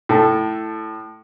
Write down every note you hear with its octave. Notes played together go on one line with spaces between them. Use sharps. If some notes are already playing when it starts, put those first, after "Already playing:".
A2 A4